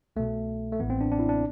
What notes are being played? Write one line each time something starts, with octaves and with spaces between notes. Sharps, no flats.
C2 B2 A3
A3
A1 A2 E3 B3
C4
D4
D4
E4
D4